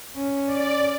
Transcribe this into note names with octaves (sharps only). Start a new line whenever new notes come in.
C#4
D5